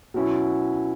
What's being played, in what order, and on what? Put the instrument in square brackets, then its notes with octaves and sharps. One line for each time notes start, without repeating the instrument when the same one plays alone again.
[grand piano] B2 F#3 C#4 E4